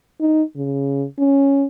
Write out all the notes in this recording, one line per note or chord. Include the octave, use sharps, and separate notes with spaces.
D#4
C#3
C#4